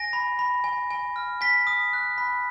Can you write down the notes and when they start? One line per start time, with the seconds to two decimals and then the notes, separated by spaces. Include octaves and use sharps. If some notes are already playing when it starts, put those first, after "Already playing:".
Already playing: G#5 A#6
0.13 B5
0.39 B5
0.64 G#5
0.91 G#5
1.16 F6
1.41 G#5 B6
1.67 D#6
1.93 F#6
2.18 B5